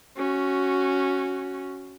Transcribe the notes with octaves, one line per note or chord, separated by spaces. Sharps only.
C#4 F#4